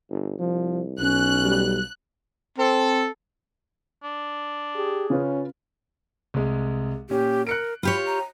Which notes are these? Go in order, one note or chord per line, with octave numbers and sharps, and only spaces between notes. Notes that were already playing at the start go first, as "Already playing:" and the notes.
G1
C2 F3
B1 C#4 F#6
G3
C4 A4
D4
G4 G#4
C#3 C#4 F4 B4
C2 G#3
A#2 C#4 G4
A#4 F#6 C#7 D7
F4 G4 C#5 B5
A#5